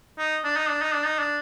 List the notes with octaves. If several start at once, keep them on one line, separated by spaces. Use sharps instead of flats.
D#4
D4
D#4
D4
D#4
D4
D#4
D4